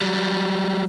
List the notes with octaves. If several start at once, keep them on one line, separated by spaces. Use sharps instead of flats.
F#3 G3